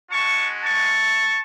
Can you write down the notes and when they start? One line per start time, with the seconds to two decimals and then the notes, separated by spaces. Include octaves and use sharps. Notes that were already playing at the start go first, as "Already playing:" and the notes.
0.10 G#3 C#4 F#4 A5 C#6
0.63 A5 C#6